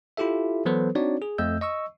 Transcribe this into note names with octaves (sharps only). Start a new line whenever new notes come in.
E4 F4 G4 A4 E5
E3 F#3 B3 A4 B4 C5
C4 D4 D#4 F#4 C#5 D5
G#4
F2 A3 D#5 E6 G6
D#5 C#6 E6